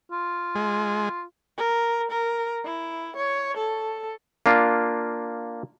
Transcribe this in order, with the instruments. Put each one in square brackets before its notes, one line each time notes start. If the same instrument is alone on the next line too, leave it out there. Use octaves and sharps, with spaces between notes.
[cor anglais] F4
[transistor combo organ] G#3
[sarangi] A#4
A#4
E4
C#5
A4
[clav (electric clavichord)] A#3 D4 F4